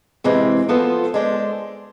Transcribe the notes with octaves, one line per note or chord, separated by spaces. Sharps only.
C3 E3 G#3 C4
F3 B3 F4 A4 C5
G#3 D4 A4 C5